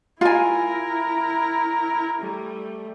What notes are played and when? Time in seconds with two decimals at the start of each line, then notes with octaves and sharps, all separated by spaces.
0.21 E4 F4 A#4 G#5
2.21 G3 A3